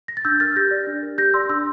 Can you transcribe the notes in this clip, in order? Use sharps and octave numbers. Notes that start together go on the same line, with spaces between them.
A#6
A6
D4 E6 G6
A#4 F6 A6
G4 G6 A#6
D5
D4
A#4
G4 G6 A#6
D5 C6 E6
D4 C6 E6